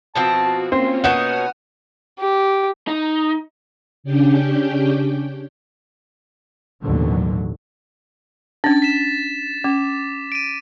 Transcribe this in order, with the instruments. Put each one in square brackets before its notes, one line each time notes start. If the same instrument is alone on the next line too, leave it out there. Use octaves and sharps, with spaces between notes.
[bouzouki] B2 F3 C4 [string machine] F#4 [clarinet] A5
[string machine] A#3 C#4 F4 [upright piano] C4 [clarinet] C6
[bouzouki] B2 D#4 C#5 [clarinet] B4 [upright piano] F#5 E7 [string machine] D#6 F6
[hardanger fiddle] G4
[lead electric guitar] D#4
[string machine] C#3 C#4 D4 G4 G5
[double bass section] A1 D#2 B2 D3 F#3
[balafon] C#4 D4 [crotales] A6
[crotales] B6 E7
[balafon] C#4 [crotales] D6
[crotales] D7 D#7